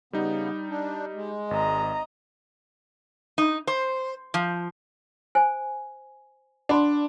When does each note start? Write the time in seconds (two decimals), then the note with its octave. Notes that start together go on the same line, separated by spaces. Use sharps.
0.13 C#3 G3 B3 D#4
0.69 D4
1.14 G#3
1.51 G#1 D#5 A#5
3.38 D#4
3.67 C5
4.34 F3
5.35 C5 G#5
6.69 D4 F#5 B5 C6